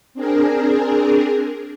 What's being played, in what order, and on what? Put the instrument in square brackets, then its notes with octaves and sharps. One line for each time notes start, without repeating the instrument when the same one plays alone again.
[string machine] C4 D4 G#4 A#4